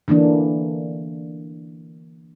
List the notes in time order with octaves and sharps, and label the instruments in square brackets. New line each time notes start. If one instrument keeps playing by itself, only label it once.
[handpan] D3 E3 A#3 D4